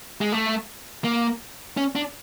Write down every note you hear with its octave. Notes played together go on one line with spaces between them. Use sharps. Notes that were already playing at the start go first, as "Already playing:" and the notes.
G#3
A3
A#3
C#4
D4